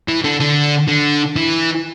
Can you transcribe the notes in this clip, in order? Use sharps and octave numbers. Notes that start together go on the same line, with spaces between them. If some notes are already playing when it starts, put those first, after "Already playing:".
E3
D3
D3
D3
E3